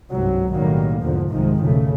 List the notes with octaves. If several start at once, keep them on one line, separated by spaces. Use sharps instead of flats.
G1 C2 G#2 C3 F#3
B1 A2 D#3 F#3 G3 A#3
E2 G#2 B2 D3 F3
C2 G#2 C3 D#3 F3 G#3
B1 F#2 C#3 A3